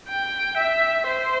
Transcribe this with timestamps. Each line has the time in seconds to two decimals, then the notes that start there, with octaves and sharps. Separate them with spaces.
0.08 G5
0.57 E5
1.07 C5